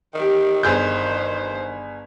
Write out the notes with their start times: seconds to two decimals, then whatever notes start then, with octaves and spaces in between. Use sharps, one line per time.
0.14 D#3 G4 G5
0.63 G1 G#4 C5 G6